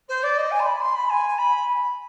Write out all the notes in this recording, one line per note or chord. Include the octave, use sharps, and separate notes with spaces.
C5
D5
D#5
G#5
C6
B5
C6
B5
G#5
B5